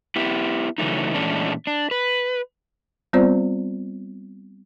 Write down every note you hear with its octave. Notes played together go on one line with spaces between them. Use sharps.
B3 E4 G4
C#3 E3 F#3 A3 D#4
A#2 E3 G#3 A3 C#4 D4
D4
B4
G3 B3 C4 F4 C5 D5